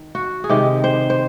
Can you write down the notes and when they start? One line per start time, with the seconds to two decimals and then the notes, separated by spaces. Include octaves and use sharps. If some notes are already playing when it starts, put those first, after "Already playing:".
Already playing: D#3
0.15 F#4
0.44 G#4
0.49 C3 D#3 G#3 G4
0.84 C5
1.10 C5